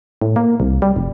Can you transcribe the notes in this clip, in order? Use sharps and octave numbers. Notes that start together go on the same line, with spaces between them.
A2
A#3
C2
G3
F1